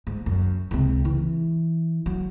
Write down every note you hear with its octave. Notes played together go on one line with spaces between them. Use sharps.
G#2
F#2
C#2 C3
E3
F#3